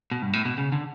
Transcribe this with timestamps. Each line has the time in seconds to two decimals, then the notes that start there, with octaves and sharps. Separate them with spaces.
0.11 B2
0.22 G2
0.33 A2
0.45 B2
0.58 C#3
0.72 D3